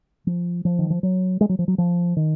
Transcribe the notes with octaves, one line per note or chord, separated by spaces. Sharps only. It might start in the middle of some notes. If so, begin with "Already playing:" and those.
F3
F3
D#3
F3
F#3
G#3
F#3
F3
F#3
F3
D#3